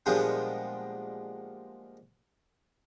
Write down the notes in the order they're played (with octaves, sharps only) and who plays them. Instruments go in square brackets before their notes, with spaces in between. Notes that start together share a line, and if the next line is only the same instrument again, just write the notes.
[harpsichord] A#2 F3 G3 G#3 B3 D4